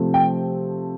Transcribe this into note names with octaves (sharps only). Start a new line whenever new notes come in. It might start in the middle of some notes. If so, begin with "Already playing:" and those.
Already playing: C3 F3 A3 C4
G5